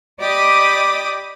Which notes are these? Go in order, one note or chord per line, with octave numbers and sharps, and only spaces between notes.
G4 D5 D#5 B5 D6 D#6